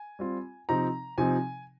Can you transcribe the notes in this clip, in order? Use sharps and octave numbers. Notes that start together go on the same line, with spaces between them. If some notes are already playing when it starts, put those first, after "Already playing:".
Already playing: G#5
G3 C4 F4
C3 F3 C4 D#4 A#5
C3 F3 C4 D#4 G#5